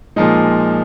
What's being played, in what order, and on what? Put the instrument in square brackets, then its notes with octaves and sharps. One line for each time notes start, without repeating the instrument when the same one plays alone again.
[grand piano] A#2 F3 G#3 D#4